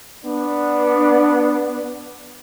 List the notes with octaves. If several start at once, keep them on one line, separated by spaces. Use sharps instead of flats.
B3 D4